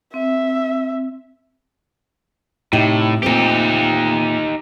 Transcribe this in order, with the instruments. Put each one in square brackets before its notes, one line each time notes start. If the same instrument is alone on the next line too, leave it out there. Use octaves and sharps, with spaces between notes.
[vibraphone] C4 [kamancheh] E5
[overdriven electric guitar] A2 [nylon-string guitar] C3 D#4 G4
[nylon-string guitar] A#2 A3 C4 [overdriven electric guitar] D#4 G4